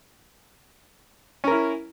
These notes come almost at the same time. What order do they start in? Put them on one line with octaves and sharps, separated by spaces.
C#4 A#4 E4